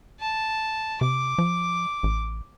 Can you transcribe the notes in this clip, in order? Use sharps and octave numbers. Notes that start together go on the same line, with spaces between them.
A5
C3 D6
F3
A1